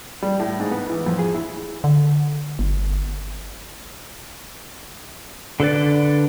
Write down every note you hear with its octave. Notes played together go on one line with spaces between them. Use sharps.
G3
A2
G#2
B3
E3
F2
G#4
E4
D3
G1
D3 A4 B4 D5